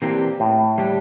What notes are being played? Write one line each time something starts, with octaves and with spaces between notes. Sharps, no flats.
C3 E3 A#3 D4 G4
A2
D3 G3 D4 G4